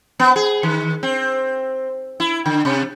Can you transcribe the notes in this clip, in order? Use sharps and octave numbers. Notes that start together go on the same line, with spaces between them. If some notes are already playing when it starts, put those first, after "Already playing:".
B3
G#4
D#3
C4
E4
D3
C3